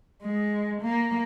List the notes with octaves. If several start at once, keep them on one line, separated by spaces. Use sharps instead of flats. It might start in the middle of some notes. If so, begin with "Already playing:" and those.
G#3
A#3